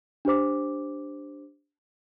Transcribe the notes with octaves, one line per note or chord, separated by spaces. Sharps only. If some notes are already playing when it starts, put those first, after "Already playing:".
D4 G4 C5 D6